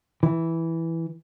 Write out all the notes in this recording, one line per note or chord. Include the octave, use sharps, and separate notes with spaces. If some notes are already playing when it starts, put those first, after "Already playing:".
E3